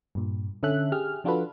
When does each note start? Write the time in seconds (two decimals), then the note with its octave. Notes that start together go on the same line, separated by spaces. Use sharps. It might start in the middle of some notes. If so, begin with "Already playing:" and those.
0.15 G2 A#2
0.63 D3 C#4 A4 E5 F#6
0.92 G4 G#4 F6
1.24 F3 D4 F4 F#4 A4 B4